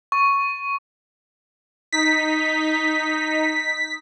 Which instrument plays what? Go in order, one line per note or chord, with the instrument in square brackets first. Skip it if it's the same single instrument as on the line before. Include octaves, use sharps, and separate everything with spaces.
[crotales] C#6
[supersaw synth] D#4 [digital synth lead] B6